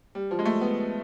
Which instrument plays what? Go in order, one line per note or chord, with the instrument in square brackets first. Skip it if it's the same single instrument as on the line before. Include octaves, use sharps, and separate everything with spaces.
[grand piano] G3
F3
G#3
A3
B3